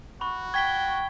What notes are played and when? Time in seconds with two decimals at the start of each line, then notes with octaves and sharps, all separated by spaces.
0.21 F#4 B5 C#6
0.54 G5 C#6 G#6 B6 G7